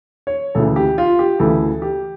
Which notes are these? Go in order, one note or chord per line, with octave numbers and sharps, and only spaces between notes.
C#5
D2 C#3 E3 A4
G4
F4
G4
D2 C#3 E3 A4
G4